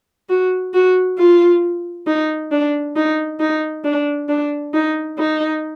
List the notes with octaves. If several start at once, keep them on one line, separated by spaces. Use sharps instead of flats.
F#4
F#4
F4
D#4
D4
D#4
D#4
D4
D4
D#4
D#4